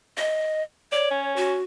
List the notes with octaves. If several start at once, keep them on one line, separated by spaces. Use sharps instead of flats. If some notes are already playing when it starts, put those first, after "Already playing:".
D#5
C#5 D5
C#4
F#4